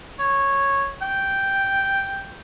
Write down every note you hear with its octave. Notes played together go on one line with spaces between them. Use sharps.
C#5
G5